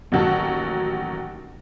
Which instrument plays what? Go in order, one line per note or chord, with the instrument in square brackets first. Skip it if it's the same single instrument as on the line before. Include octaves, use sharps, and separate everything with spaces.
[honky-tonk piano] A1 D#2 F#3 F#5 A5 C#6